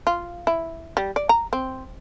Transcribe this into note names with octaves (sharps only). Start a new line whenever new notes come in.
F4
E4
G3
D5
A#5
C4